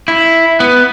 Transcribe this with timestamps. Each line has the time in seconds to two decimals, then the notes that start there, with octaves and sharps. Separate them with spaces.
0.08 E4
0.60 B3